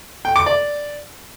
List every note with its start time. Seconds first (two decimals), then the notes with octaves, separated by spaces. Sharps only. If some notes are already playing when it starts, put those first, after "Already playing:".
0.25 G5
0.36 D6
0.46 D5